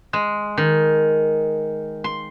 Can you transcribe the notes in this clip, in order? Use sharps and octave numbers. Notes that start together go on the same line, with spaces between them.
G#3
D#3
C6